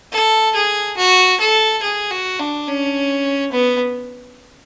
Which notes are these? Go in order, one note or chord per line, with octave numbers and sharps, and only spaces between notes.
A4
G#4
F#4
A4
G#4
F#4
D4
C#4
B3